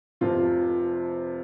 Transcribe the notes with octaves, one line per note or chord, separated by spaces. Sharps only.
F1 F2 C3 F3 F4